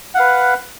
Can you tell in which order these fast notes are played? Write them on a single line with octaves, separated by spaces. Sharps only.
F#5 F5 B4